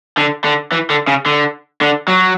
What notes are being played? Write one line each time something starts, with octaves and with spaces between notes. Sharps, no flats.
D3
D3
E3
D3
C#3
D3
D3
F#3